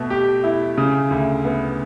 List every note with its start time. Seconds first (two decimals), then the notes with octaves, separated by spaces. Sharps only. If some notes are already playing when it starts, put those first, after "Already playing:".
Already playing: B2 A3
0.10 G4
0.44 E4
0.78 C#3
1.11 D2
1.44 B3